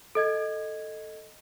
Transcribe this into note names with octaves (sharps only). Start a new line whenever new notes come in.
A4 D#5 G#6